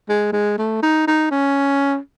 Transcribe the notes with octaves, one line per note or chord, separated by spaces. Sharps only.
G#3
G#3
A3
D#4
D#4
C#4